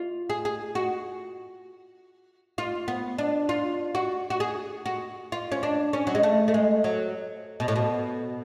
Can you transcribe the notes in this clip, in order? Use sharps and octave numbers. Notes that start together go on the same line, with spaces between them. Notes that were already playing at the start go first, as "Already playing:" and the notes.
Already playing: F4
G#4
G#4
F#4
F4
B3
D4
F4
F#4
F#4
G#4
F#4
F4
C#4
D4
C#4
F#3
G#3
A3
A3
G#3
F#3
B2
A2
B2